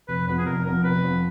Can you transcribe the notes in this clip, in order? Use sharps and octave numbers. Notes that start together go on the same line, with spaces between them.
F1 B4
F2 F3 B3 B4
G#4
F1 A#4
F2 F3 B3 A#4
F1 B4
F2 F3 B3